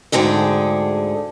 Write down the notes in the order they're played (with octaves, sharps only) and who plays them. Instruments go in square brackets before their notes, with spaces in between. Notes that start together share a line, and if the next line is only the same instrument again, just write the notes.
[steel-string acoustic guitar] D2 G#2 D3 G#4 G5